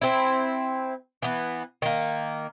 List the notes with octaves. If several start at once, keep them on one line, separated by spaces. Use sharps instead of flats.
C4 E4
E3 B3
D#3 A#3